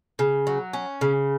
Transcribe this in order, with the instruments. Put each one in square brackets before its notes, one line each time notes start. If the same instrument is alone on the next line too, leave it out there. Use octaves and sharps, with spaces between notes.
[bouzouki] C#3
F#3
C#4
C#3